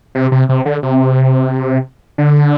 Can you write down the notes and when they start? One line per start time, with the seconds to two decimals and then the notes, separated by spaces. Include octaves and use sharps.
0.15 C3
0.32 C3
0.49 C3
0.66 D3
0.83 C3
2.18 D3